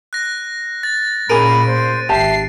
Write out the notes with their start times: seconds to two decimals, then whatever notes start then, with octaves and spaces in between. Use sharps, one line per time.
0.13 F#6 A#6
0.83 A6
1.30 A#2 C#4 G#4 A#4 B5 D7 D#7
1.66 C5
2.09 G#1 G4 E5 A5 C7